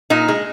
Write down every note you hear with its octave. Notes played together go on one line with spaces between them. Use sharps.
A#2 D#4
G#3